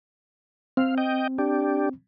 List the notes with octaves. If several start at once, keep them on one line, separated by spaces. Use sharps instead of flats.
C4 F5
D#5 G5
D4 G4